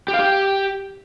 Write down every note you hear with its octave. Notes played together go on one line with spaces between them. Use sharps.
G4
F5
G4